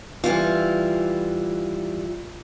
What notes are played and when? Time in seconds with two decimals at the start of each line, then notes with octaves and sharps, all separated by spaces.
0.24 E3 G3 E4 F4